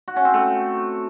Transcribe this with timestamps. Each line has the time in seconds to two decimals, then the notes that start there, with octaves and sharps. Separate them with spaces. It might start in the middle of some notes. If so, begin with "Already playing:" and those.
0.08 F#4
0.16 C#4
0.25 C4
0.34 A3